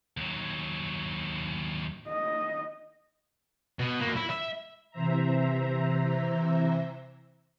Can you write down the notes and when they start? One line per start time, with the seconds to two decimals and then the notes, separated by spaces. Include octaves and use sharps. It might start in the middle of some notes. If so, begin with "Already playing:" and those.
0.17 D#2 F#3
2.08 D#5
3.79 B2
4.00 A#3 F#4
4.16 E4
4.30 E5
4.91 C3 E3 C5 E5 A#5